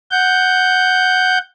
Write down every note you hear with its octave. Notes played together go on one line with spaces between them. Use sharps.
F#5 G6